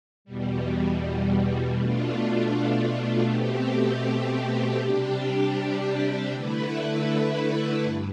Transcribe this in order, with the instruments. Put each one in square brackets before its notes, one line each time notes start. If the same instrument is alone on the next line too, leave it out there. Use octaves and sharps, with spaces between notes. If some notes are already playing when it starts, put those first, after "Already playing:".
[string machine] E2 B2 G3
B2 A3 D4 F4
B2 A3 C4 G4
C3 G3 D4 G4
D3 A3 E4 B4
G2